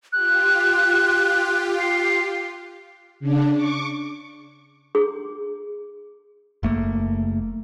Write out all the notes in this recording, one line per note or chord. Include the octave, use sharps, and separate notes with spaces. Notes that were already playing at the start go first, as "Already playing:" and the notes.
F4 G4 F#6
C7
C#3 D4
C#6 D6
G#4
F#1 A3 A#3